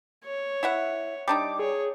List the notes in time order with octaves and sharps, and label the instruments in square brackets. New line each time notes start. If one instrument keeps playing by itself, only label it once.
[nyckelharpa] C#5
[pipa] E4 E5 F#5
[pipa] G3 D4 D#4 [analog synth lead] D6
[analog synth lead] G#4 [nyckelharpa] C#5